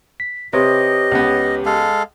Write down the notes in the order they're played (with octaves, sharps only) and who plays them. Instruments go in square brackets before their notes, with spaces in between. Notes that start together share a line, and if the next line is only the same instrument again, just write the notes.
[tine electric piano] B6
[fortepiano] C3 [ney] G4 [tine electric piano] B4 C#5 D#6 [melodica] D#5
[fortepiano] C#2 B3
[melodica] G#3 A4 F5